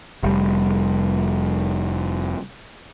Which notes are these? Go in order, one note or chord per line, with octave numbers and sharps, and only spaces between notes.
F1 G3